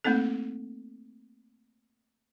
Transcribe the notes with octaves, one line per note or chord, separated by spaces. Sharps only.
A3 A#3 C4 D#4 A4